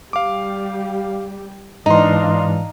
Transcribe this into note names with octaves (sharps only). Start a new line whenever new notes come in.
G3 G4 F5 D6
G#2 E3 D4 D#4 D#5 F5 A#5 C6